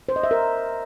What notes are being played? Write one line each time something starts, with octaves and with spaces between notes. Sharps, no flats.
C5
D#5
E5
A#4